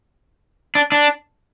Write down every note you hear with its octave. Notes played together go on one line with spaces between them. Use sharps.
D4
D4